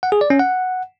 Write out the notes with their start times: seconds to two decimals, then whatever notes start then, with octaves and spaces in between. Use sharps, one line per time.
0.03 F#5
0.12 G#4
0.21 D5
0.30 C#4
0.39 F#5